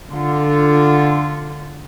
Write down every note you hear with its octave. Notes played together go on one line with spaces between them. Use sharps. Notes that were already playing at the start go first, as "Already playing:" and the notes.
D3 F4